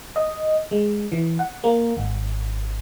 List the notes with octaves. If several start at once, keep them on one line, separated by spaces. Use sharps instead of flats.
D#5
G#3
E3
F#5
A#3
G#1